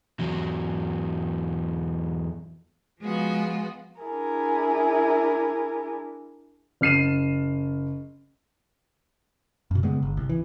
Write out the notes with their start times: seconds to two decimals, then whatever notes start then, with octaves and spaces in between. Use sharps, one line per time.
0.20 E2 F#3
3.00 F3 G#3 B3 F4 F#4
4.00 D4 E4 G#4 A#4
6.81 F#1 F6 C7 D#7 E7
9.71 F#2 B2
9.83 C#3 G3 G#3 B3
10.02 G1
10.17 C2
10.29 E3